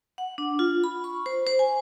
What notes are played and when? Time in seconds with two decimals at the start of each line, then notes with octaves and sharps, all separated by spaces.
0.18 F#5
0.38 D4
0.59 F4
0.84 B5
1.04 C#6
1.26 C5
1.47 C5
1.59 G#5